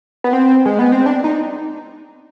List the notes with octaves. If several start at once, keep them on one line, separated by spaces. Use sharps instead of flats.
B3
C4
G#3
B3
C4
D4
D#4